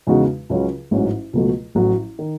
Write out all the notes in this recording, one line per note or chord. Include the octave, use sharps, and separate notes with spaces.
E2 C#3 G#3 D#4 F#4
C#2 C#3 F#3 C#4 F#4
A1 G#2 F#3 C#4 F#4
C#2 B2 F#3 A3
A1 A2 F#3
D#3